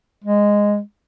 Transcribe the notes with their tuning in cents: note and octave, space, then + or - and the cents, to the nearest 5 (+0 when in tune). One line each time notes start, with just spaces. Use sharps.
G#3 -10